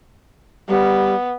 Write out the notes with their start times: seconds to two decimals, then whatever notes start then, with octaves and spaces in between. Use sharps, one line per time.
0.68 G3 B3